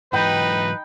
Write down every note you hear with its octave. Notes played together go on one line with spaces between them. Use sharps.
G#2 E3 F#3 D#4 B4 G5 B5